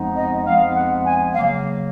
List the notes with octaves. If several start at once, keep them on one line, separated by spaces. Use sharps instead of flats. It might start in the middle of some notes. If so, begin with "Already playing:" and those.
Already playing: F2 F3 G#3 B3 D#4
D#5
F2 F3 G#3 B3 D#4 F5
F#5
G#5
C#3 F#3 A#3 F5